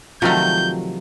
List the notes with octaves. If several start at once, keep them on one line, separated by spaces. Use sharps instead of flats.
C3 D#3 F3 F#3 A3 G6